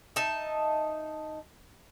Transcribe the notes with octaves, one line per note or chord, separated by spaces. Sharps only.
D#4 E5 A5